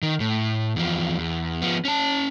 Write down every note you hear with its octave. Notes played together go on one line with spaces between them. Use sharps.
D#3
A2
E2 F3
E2
F3 B3
C#4 A5